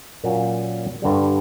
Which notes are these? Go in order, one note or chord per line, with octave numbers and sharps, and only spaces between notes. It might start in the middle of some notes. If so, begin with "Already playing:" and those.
A#2 F#3 A#3 C#4
G2 D3 G3